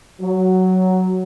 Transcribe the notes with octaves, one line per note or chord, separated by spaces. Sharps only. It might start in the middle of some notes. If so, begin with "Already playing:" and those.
F#3